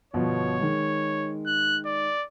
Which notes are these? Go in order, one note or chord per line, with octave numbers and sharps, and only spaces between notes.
G1 B2 F3 C#5
D#3 G#3
F#6
D5